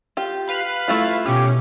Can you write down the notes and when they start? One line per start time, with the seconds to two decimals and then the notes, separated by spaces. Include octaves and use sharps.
0.17 F4 G4
0.48 B4 F5 B5
0.88 A3 E4 F4
1.26 B2 C#4 G4